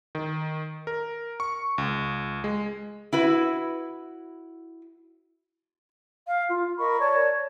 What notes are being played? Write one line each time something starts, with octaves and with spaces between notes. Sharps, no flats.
D#3
A#4
C#6
C#2
G#3
E4 F#4 B4
F5
F4
A#4 D#5 B5 C#6
C#5 D5 A5